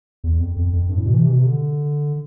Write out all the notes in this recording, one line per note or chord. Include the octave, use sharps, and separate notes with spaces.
E2
F2
F2
F2
G2
A2
B2
E3
C3
B2
C3
D3